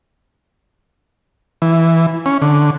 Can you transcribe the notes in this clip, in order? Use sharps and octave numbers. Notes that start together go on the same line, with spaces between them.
E3
C#4
D3